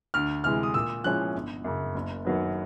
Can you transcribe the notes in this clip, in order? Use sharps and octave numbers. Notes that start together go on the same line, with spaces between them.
D2 F6
C3 E3 G#3 F6
D#6
A#2 E6
F3 G#3 C#4 E4 F#6
G1
F#2 C#3
F#1
F#2 D#3 F#3 B3